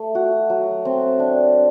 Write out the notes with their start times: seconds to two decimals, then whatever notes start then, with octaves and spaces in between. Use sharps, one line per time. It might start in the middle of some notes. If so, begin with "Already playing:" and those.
Already playing: A3
0.15 F#4
0.50 F#3
0.85 C4
1.20 D4